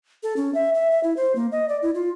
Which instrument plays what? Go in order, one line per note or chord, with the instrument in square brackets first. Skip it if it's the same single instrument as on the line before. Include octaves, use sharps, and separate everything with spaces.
[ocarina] A4
C#4
E5
E5
E5
E4
C5
A#3
D#5
D5
E4
F4